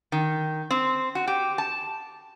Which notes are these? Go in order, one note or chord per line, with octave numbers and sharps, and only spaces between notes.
D#3
C4
F#4
G4
A5